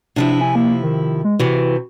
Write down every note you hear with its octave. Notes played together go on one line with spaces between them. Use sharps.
C3 F3 D4 E4
G#5
A#3
D#3
G#3
C3 E3 F#4